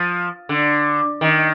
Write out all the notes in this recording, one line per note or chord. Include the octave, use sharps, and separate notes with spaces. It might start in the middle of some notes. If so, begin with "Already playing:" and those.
Already playing: F3
D3
D#3